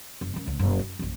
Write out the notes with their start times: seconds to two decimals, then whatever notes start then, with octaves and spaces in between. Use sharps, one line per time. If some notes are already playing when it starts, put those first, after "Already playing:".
0.21 F#1
0.34 D#3 C#4
0.46 D1 C#2
0.59 F#1 B2
0.79 F#2
0.99 A#1 F#2